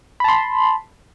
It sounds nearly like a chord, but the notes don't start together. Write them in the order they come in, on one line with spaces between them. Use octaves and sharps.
B5 A5 C6